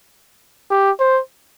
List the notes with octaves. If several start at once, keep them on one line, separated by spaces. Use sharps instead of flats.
G4
C5